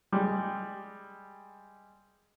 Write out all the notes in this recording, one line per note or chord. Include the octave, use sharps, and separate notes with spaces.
G3 G#3